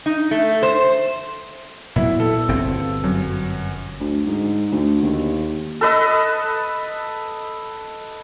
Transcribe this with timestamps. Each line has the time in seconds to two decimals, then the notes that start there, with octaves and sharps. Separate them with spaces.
0.06 D#4
0.31 A3
0.63 C5
1.96 A#2 F#3 B3 E4
2.20 A4
2.49 G1 B2 C4
3.04 F#2
4.00 D2
4.27 G#2
4.71 D2
5.02 D#2
5.81 A4 B4 D#5 E6